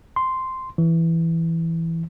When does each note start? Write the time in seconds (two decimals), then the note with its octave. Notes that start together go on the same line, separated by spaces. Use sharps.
0.16 C6
0.78 E3